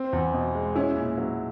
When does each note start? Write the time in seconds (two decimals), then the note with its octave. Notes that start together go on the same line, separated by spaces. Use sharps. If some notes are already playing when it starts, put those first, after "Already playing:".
Already playing: C4
0.13 E2
0.34 B2
0.55 G#3
0.75 C#4 E4
0.97 A#2
1.18 F#3